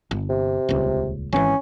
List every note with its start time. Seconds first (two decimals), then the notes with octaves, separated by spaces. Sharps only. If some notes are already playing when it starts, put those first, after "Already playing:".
0.11 G1
0.29 C3
0.69 D#1 C#2
1.33 G#1 E3 C#4